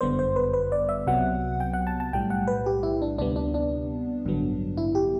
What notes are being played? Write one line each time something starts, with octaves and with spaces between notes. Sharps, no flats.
G1 F#2 D3 G3 B3 C5
C5
B4
B4
D5
E5
C2 C3 F#3 B3 F#5
G5
F#5
A5
A5
B1 A2 G3 G5
F#5
B4
G4
E4
D4
D2 C3 G3 B3 D4
D4
D4
A1 G2 D3 F#3 B3
E4
G4